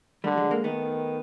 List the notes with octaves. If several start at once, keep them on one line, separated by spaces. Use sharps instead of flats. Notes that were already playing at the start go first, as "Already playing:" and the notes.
D3 G3 A3
F#3 G#3
G#3 A#3
D#3 A3 B3